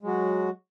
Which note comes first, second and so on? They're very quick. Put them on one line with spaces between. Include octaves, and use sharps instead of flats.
G#3 F#3 F#4